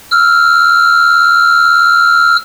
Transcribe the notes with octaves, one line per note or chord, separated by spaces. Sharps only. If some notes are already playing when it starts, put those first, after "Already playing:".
E6 F6